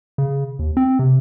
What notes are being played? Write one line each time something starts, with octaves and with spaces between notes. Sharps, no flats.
C#3
D#2
C4
C3